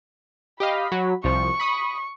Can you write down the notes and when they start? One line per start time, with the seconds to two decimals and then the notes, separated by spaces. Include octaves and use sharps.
0.60 G4 D#5 F5 B5
0.92 F#3
1.24 C2 F3 C#6
1.60 B5 D#6